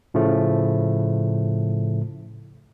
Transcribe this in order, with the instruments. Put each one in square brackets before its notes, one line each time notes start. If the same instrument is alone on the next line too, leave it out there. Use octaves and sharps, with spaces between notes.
[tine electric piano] A2 C#3 F3 A3